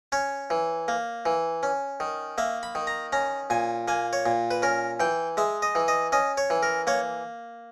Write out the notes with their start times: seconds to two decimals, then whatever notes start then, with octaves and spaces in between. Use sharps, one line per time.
0.12 C#4 C#5
0.50 E3
0.88 A#3
1.26 E3
1.63 C#4
2.00 D#3
2.38 A#3 E5
2.63 B5
2.75 D#3
2.87 A#5
3.13 C#4 A#5
3.50 A#2 G#5
3.88 A#3 G#5
4.13 C#5
4.26 A#2
4.51 B4
4.62 C#4 A#4
5.00 E3 G5
5.37 G#3 E5
5.62 D#5
5.75 E3
5.88 D#5
6.12 C#4 D#5
6.37 C#5
6.50 E3
6.63 A#4
6.87 A#3 C#5